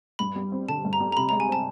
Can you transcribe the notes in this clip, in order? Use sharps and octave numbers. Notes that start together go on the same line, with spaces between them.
G2 B5
G3
C4
D3 A5
G2
A#5
G3
A#5
C3 B5
G#3 A#5
G#5
C4 A5